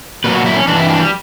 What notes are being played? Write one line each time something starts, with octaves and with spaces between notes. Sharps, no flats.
A#2 F#3 B4
F#4
E4
C#4
G2 E3 D4
E4
D4
G3